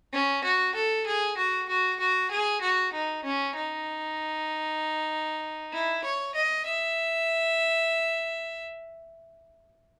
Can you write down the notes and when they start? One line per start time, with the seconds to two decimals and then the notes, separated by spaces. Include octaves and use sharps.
0.13 C#4
0.44 F#4
0.75 A4
1.06 G#4
1.37 F#4
1.69 F#4
2.00 F#4
2.31 G#4
2.61 F#4
2.93 D#4
3.24 C#4
3.56 D#4
5.73 E4
6.04 C#5
6.35 D#5
6.66 E5